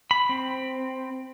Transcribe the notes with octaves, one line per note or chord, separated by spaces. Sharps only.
B5
C4